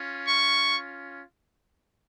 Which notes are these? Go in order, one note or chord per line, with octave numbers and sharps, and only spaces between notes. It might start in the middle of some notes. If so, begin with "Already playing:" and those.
Already playing: C#4 F4
C#6